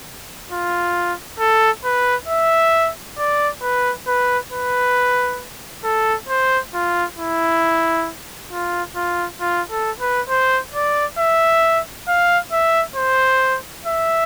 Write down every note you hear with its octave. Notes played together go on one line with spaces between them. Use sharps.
F4
A4
B4
E5
D5
B4
B4
B4
A4
C5
F4
E4
F4
F4
F4
A4
B4
C5
D5
E5
F5
E5
C5
E5